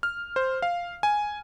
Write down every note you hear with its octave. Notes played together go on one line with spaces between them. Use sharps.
F6
C5
F5
G#5